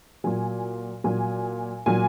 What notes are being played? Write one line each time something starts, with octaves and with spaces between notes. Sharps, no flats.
A#2 F#3 G#5
A#2 F#3 G#5
A#2 F#3 G#5